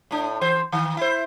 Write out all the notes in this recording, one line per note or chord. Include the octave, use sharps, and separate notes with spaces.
A2 D4
E3 C5
D#3
E4 C5